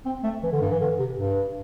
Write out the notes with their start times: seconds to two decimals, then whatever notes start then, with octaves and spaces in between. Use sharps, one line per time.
0.06 C4
0.24 A3
0.43 E3
0.52 D3
0.61 G2
0.71 E3
0.81 D3
0.99 C3
1.18 G2